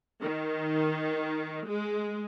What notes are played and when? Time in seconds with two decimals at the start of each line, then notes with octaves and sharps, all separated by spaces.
0.20 D#3
1.67 G#3